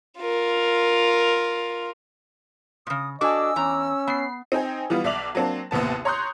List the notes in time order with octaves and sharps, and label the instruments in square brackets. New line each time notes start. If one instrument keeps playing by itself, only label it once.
[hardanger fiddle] F4 A#4
[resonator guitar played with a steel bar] A#2 C#3 [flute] D#6
[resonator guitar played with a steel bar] D4 F#4 A4 [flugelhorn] D#5 [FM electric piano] G#5 D6 [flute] E6
[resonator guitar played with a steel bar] E2 A#5 [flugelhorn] C#4
[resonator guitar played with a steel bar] B3 [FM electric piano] B5 C7
[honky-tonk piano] C4 D#4 G5 G#5
E3 G3 B3 F4
B1 D5 E5 D6 F7 F#7
F#3 A#3 C4 D4
A1 D#2 C3 B3 A5
C#5 A#5 C6 D#6 F#6 G6